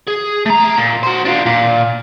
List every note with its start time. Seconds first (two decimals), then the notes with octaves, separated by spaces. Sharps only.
0.08 G#4
0.46 A3 A#5
0.77 A#2
1.03 F#4 C5
1.25 D4 F4
1.46 A#2